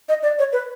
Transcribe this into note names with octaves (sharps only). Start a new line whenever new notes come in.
D#5
D5
C#5
B4